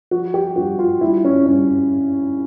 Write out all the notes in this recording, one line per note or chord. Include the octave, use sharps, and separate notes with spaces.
F3 F#4
G4
G2 F#4
F4
G2 E4
C#4
G2 C#4